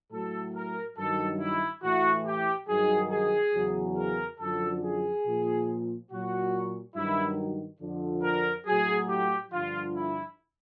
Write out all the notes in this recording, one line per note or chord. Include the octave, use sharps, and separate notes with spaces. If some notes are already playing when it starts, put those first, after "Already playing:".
A2 F#3 A4
A#4
G2 D#3 F#3 A4
E4
A2 E3 F#4
G4
G2 D#3 F#3 G#4
G#4
E2 C#3 F#3
A#4
F#2 D3 F3 A4
G#4
A#2 F3
A#2 F#3 F#4
G2 D#3 F#3 E4
F2 D3 F3
A#4
A2 F#3 G#4
G4
G2 D3 F3 F4
E4